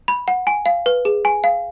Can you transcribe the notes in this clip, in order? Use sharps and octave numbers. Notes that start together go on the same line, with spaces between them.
B5
F#5
G#5
F5
B4
G#4
G#5
F5